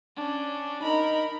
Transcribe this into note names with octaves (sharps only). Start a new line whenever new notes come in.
C#4 D4
D#4 A#4 B5